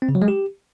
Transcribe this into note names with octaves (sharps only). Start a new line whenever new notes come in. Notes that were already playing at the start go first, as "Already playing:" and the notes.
C4
C#3
F#3
G#3
G4